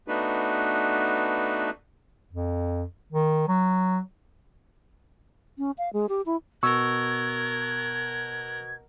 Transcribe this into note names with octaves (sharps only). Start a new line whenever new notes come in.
A3 B3 D4 D#4 F#4 B4
F2
D#3
F#3
C#4
F5
G#3
G4
E4
B2 A#4 C#6 E6 F#6 G#6